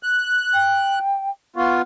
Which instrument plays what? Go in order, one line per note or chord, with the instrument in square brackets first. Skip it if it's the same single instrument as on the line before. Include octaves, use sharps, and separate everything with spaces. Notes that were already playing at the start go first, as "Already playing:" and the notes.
[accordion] F#6
[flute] G5
[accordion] B3 F4 [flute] C#6